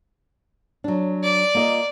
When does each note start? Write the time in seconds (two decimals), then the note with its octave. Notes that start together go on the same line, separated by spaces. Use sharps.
0.84 F#3 D4
1.23 D5
1.55 A#3 F4 D#5